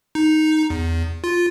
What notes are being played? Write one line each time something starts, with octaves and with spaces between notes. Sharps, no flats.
D#4
E2
F4